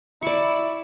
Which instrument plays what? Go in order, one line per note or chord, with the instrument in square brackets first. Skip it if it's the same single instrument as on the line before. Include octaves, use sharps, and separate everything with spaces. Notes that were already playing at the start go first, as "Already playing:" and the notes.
[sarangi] E4 [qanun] D5 C#6